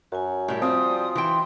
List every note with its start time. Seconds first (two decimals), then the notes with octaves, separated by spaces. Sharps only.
0.12 F#2 F#4 G#5
0.48 A2 G3 G4
0.62 F3 G3 C4 D#6
1.15 E3 G5 C6